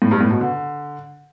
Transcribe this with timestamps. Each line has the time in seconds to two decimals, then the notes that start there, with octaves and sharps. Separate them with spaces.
0.02 A2
0.11 G2
0.21 A2
0.31 B2
0.41 D3